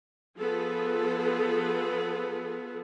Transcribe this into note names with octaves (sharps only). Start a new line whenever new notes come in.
F3 B3 G#4 A4 B4